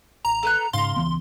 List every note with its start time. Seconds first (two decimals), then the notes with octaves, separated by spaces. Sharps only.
0.25 A1 A#5
0.43 A4 B4 F#6
0.73 G#2 C#3 F5 A#5 C6
0.96 C#2 E3 B3